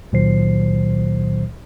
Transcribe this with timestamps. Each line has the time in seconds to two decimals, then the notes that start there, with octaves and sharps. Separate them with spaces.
0.12 C#2 A#2 D#3 F#3 C5 C7